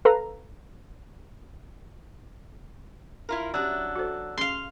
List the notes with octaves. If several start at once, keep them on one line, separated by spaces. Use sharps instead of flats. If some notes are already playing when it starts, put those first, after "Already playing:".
A4 B4 F5 A#5
E4 F4 A#4
F#3 C#4 D4 G4 D5 E6 F#6
F#4 A4 C5
C#4 G#4 F5 C6